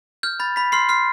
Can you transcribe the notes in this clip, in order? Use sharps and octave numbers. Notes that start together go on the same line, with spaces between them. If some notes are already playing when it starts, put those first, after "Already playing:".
F6 G6
B5 A6
B5 B6
C6 F6 C7
C6 F6 C7